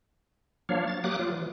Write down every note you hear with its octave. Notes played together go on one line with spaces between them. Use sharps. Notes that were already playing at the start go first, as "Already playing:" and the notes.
F3 F#3 A#3 D4 C#5 F5
A6
F#3 A#3 G4 D6 D#6 F#6
F#3 F4
E3